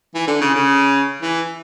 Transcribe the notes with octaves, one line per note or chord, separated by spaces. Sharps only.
E3
D3
C#3
C#3
E3